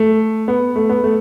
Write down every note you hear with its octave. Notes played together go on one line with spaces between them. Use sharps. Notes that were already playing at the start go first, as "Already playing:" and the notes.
Already playing: A3
B3
A3
B3
A3